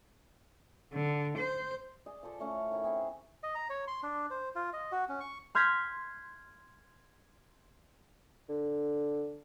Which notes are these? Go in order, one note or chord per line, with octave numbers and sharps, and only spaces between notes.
D3
C5
G#4 D5 D#5
F3 A4 C5 D5
A2 A3 C#4 F5
D#3 E4 E5
C4 E4 G#4
D#5
A#5
C#5
C6
D4
C5
F4
D#5
F#4
C#4
C#6
C6 F6 G6 G#6 A#6 B6
D3